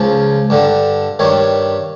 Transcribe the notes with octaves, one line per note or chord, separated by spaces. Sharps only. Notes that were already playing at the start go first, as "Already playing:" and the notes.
Already playing: C#2 C#3 F3
G2 D3 G3
G2 D#3 G3 C#5